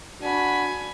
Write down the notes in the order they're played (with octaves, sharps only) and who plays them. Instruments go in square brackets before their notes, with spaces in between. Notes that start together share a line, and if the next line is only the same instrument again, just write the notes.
[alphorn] D4 [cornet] F#4 [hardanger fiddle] G#5 B5